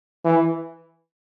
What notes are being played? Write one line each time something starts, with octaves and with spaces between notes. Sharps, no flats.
E3